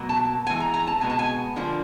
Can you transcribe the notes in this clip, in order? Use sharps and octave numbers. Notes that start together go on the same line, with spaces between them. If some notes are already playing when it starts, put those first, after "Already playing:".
Already playing: B2 F#3 A#3
A5
E3 G#3 B3 G#5
A#5
A#5
A5
B2 G#3 B3 G#5
A5
G#5
D3 F3 A#3 D4